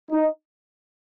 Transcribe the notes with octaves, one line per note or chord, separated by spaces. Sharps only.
D#4